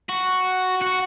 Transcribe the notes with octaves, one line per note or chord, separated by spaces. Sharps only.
F#4
F#4